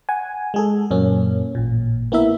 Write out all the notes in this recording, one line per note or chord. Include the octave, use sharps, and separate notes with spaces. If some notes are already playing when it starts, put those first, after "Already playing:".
F#5 G#5
G#3 G#4 A4
F#2 A#2 A#3 C#4
A1 A#2
A#3 B3 E4 A#4 E5